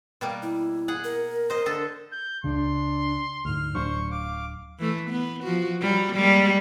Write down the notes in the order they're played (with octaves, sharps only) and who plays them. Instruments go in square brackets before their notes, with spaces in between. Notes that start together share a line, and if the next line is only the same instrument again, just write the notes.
[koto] B2 G3 A#3
[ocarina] E4
[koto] G#4 F#5
[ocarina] A#4
[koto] C5 D#5
D3 A4
[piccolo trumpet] G6
[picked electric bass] C#2 C#3 [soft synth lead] D4 [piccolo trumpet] C6
[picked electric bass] D2 G#2 [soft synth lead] F6
[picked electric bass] D1 F#3 D4 [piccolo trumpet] C5 [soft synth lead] C#6
[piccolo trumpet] F5 [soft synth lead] D6
[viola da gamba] E3 A3
B3
F3 F#4
F#3 G3
G3 G#3 A#3